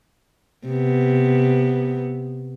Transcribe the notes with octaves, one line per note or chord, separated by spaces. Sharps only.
C3 B3